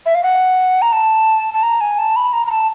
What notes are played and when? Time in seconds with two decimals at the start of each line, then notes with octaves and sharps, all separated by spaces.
0.06 E5
0.15 F5
0.23 F#5
0.82 A#5
0.92 A5
1.54 A5
1.63 A#5
1.81 G#5
1.99 A5
2.16 B5
2.33 A#5
2.46 A#5
2.51 A5